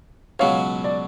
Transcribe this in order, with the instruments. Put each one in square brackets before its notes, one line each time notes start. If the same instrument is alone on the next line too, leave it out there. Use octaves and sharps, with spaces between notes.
[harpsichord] C#2 B2 F#3 [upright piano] C#5 F5
[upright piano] D5